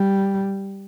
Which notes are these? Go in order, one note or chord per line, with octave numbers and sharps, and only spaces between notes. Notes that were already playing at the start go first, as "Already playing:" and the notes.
Already playing: G3